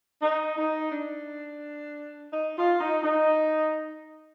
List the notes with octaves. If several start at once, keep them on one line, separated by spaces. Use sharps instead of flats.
D#4
D#4
D4
D#4
F4
D#4
D#4